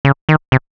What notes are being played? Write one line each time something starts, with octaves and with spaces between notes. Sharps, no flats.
C#3
D#3
C3